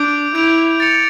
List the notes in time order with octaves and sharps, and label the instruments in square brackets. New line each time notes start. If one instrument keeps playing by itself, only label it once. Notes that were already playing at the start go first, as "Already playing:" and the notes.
Already playing: [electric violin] D4 [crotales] D6 G6 D7
[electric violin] E4 [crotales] G6 D7 F7
[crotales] A6 C#7 F7